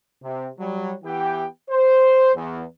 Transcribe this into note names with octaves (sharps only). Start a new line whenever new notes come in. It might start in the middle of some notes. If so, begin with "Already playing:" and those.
C3
F#3 G3
E3 B3 G4 G5
C5
E2